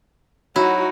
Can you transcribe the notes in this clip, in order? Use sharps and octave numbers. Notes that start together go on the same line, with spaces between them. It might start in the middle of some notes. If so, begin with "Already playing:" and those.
F#3 D#4 E4 F#4